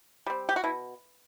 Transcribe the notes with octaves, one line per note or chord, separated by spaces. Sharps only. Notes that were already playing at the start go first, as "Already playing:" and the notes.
G3 C4
G4
F#4
B2 E4